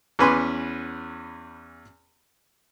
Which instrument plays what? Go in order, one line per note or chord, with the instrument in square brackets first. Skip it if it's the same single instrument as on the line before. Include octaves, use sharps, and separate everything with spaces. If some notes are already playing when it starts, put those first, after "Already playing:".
[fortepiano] E2 C#4 B4 G#5 C6 D6